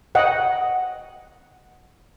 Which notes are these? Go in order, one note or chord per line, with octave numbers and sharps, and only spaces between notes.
D#5 F#5 G5